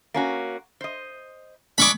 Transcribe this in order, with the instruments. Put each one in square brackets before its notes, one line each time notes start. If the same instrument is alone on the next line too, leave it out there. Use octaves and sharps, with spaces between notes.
[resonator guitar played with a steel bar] A#3 C#4 F#4
C5 D#5
[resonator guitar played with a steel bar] G#3 D4 [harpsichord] B5 C#6 D6